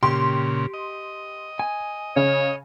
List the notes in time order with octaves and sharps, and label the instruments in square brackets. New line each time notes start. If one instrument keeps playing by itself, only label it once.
[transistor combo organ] A#2 C#3 [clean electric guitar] G4 [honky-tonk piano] C6
[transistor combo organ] D#5
[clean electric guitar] G#5
[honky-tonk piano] C#3 [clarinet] C#5